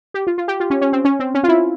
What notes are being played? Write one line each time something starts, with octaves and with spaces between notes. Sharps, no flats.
G4
F4
F4
G4
F4
C#4
C#4
C4
C#4
C4
C#4
F4
E4